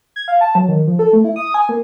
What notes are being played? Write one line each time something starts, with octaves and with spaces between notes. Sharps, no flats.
G#6
F5
A5
F#3
D#3
F3
A4
A3
E4
D#6
G#5
A#3